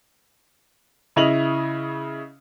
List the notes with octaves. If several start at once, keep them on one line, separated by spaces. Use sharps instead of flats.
C#3 E4 D#5 F7 F#7